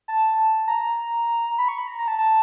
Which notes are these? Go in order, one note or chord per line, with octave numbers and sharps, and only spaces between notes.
A5
A#5
B5
C#6
B5
A#5
A#5
A5
A5